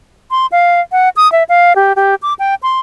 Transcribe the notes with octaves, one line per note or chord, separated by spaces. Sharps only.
C6
F5
F#5
D#6
E5
F5
G4
G4
D6
G5
C6